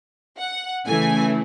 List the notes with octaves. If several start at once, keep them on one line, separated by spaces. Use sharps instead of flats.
F#5
C#3 E3 A3 E4 G#5